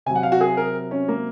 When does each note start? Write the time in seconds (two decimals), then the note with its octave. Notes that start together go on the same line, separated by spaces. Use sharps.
0.06 C3 F#3 G#5
0.15 F#5
0.23 F5
0.32 F#4
0.41 G#4
0.57 A#4
0.91 C#4
1.08 A#3